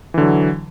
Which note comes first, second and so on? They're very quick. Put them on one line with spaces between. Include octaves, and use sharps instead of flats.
E3 D3 F#3